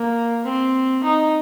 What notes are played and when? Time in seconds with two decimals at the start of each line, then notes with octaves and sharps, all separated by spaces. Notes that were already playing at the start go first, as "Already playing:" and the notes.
Already playing: A#3
0.45 C4
1.04 D#4